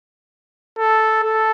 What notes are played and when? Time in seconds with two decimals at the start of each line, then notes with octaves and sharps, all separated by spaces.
0.79 A4
1.23 A4